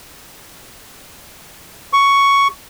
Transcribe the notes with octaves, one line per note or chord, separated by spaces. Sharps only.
C#6